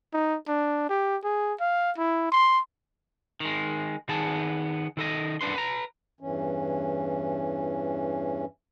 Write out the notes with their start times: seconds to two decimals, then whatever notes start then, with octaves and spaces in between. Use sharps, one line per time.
0.13 D#4
0.48 D4
0.89 G4
1.24 G#4
1.60 F5
1.97 E4
2.32 C6
3.40 D#3 G#3
4.09 D#3 B3 G#4 A5
4.97 D#3 A4 D#5
5.41 B1 F#2 B3 D4 B4 C6
5.54 B4 A#5
6.21 E2 G2 E3 C#4